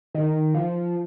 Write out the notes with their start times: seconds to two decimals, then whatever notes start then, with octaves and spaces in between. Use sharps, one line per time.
0.14 D#3
0.54 F3